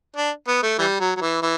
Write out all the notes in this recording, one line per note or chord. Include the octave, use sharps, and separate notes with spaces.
D4
B3
A3
E3 G3
F#3
F#3
E3
E3